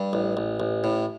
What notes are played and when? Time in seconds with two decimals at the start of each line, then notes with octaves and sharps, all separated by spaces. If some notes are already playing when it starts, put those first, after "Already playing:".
Already playing: G2
0.13 A1
0.37 A1
0.60 A1
0.84 A2